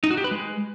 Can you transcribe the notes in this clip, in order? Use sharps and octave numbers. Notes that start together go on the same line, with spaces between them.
D#4
F#4
G4
B4
G#3